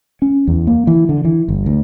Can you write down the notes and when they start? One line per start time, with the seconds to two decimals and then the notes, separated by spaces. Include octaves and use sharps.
0.22 C#4
0.48 E2
0.67 A#3
0.87 E3
1.09 D3
1.25 E3
1.48 G1
1.66 D2